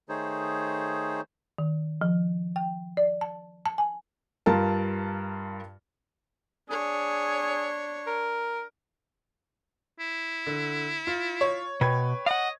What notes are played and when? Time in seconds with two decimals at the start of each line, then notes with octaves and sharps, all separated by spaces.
0.09 D#3 A3 D#4 G#4 C5 C#5
1.58 D#3
2.01 F3
2.56 G5
2.97 D5
3.21 A5
3.66 A5
3.78 G#5
4.46 G2 F4 A#4 A5
6.70 D4 G#4 C#5
8.07 A#4
10.00 E4
10.47 D3
11.07 F4
11.41 C#5
11.81 B2 B4 G5 G#6
12.26 D#5 F5 F#5